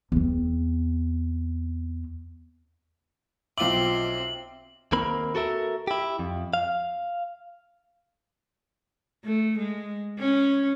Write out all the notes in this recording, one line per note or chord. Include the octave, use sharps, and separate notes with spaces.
E2 C4
B1 C4 F4 E5 D6 F#7
D#2 A#3 C4 A#4 B5
F#4 A4 A#4 E5
E4 G4
F2
F5
A3
G#3
C#4